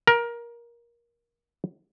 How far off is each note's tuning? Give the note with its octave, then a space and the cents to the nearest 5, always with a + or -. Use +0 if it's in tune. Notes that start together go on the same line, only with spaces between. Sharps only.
A#4 +20